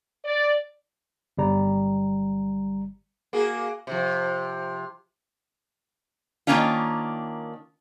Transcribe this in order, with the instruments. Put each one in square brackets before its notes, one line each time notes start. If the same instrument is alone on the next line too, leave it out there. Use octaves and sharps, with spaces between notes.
[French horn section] D5
[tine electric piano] G1 G3 A#5
[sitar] A#3 F#4 G#4
C3 F3
[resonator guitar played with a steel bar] D#3 G3 A#3 C#4 D4 F4